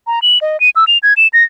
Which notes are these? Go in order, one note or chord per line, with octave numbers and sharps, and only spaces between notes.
A#5
F#7
D#5
D#7
E6
F7
G#6
E7
A#6